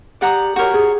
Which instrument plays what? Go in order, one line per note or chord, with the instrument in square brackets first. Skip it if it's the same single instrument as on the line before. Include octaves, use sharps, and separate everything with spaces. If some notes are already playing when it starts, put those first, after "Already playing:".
[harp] G4 [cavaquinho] D5 F#5 A#5 D#6
[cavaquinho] F#4 A#4 C#5 [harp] G4
[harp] G#4